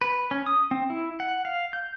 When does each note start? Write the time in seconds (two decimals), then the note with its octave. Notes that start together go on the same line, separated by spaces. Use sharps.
0.01 B4
0.31 C#4
0.46 D#6
0.71 C4
0.90 E4
1.20 F#5
1.45 F5
1.73 G6